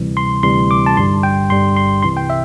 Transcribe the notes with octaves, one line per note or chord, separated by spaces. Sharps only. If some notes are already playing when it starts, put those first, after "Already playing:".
Already playing: D2 C3 E3 G3
C6
D2 C3 E3 G3 C6
D6
A5
G1 G2 D3 G3 C6
G5
G1 G2 D3 G3 C6
C6
C2 C3 E3 C6
G5
E5